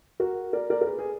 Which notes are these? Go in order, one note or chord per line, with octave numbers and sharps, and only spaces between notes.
F#4 A#4
A#4 D5
A#4 D5
A#4
G#4 B4
G#4 B4